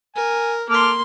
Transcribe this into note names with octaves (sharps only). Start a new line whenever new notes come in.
A#4 G#5
A#3 A4 C6 D6 F6